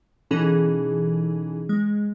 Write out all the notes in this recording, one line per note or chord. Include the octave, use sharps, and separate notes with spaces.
B2 E3 C#4 D#4 G#4 A4
G#3